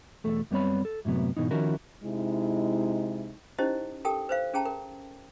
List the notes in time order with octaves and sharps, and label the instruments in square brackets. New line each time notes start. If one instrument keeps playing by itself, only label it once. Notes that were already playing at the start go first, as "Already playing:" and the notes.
[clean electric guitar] B1 E2 A3 A4
F#2 G3 B3 C4 C#5 B5
A4
F#2 A2 C3 F#3 B3
G#2 B2 E3 D#4
D#3 F3 C#4 E4 F#4 A#4
[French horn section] C3 G#3 D#4 E4
[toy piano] C#4 D#4 E4 G4 C5 D#5
G4 A4 A#4 G5 A5
B4 C5 F5
C#4 G#4 G5 A5 A#5
A#4